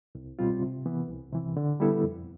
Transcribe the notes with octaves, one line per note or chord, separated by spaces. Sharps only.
C2
B2 G3 C4 F4
C3
E3 B3
C2
C3 E3
D3
G3 B3 E4 A4
F2